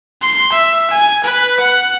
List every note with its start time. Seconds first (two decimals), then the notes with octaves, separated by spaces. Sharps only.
0.22 C6
0.52 E5
0.91 G#5
1.24 B4
1.60 F#5